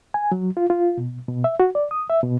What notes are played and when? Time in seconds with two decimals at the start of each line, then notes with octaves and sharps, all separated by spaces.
0.14 G#5
0.32 F#3
0.57 F4
0.70 F4
0.98 B2
1.28 B2
1.44 E5
1.60 F#4
1.75 D5
1.91 D#6
2.10 E5
2.23 B2